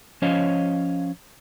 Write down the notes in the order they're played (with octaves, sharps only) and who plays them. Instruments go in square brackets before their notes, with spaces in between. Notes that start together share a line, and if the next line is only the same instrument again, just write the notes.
[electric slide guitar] F3 C#4 C5 C#5 D#5 F5